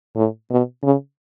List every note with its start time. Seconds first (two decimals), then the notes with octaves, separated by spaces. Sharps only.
0.16 A2
0.51 B2
0.83 C#3